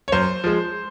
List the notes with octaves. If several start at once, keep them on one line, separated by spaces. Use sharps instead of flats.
C#5
F#2 C5
F3 G#3